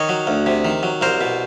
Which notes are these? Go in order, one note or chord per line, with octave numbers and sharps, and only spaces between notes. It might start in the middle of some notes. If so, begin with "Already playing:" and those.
Already playing: D#3 C#5 D#5
F#3
D2
C3
D#3
F#3
C2 A#4 C5
B2